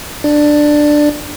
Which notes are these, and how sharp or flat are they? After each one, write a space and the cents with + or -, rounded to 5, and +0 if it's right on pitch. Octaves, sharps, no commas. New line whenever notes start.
D4 +10 D5 +10